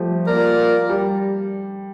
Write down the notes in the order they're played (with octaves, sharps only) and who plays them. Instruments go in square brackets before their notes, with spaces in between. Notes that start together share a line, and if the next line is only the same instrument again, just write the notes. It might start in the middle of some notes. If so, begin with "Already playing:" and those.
Already playing: [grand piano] F3 G3 A3
[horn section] A#3 F4 A#4 D5
[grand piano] G3